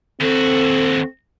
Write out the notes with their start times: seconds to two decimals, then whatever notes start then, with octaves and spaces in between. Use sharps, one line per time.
0.21 D#2 C4 F#4 A4